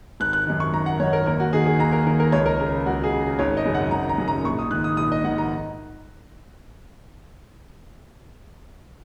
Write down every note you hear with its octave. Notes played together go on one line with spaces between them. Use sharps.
G#1 F#6
F#6
F#2 D#3
C#6
G#1 A#5
F#5
F#2 D#3 C#5
A#4
D#2 A#4
F#4
D#3 G#4
G#4
D#2 A#5
A#4
D#3 A#4
A#4
C#2 C#5
A#4
C#3 A#4
C#2 F#4
G#4
C#3
G#1 C#5
D#5
F#2 C#3
F#5
G#1 A#5
A#5
F#2 C#3
A#5
A#1 C#6
D#6
G#2 D#3 F#6
D#6
A#1 D#6
D#5
G#2 D#3 F#5
A#5